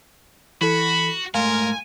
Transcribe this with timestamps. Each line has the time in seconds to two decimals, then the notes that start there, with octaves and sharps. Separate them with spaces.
0.61 E3 F#4 A4 B5
1.34 G#2 A3 A#4 F5 G#5 C6